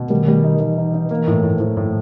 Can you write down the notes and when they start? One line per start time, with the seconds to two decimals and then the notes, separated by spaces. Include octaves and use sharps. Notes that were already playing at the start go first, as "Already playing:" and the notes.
Already playing: B2
0.10 D#3 G3
0.28 G3
0.44 D#4
0.60 E3 D#4
0.78 D#4
0.94 D#4
1.11 E3 A#3
1.27 A2
1.43 A2
1.60 A2 F3
1.77 A2